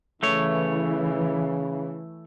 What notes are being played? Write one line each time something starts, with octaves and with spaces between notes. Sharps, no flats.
C#3 E3 A3 C#5